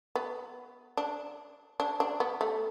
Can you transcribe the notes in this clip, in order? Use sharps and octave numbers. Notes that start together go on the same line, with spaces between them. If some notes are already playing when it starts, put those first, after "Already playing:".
B3
D4
D4
D4
B3
A3